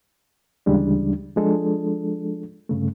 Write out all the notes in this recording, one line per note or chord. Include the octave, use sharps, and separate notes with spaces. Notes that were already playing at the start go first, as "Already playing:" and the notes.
D2 C#3 E3 G3 G#3 D4
F3 G#3 D4 A4
G2 C#3 A3